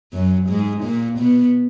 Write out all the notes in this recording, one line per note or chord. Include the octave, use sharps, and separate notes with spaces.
F#2 F#3
G#2 G#3
A#2 A#3
B2 B3